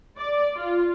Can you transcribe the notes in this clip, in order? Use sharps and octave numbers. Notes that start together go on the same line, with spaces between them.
D5
F4